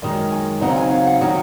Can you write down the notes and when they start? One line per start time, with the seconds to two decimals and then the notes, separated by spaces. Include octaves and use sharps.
0.02 F#2 D#3 G#3 C#4 D#5
0.31 G#5
0.61 C#3 F#3 C4 D#4 F#5
0.77 G#5
0.91 F5
1.07 F#5
1.21 D#3 F#3 C#4 F#5